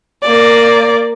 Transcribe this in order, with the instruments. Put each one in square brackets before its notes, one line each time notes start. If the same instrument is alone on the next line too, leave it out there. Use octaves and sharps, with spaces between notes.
[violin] A#3 D5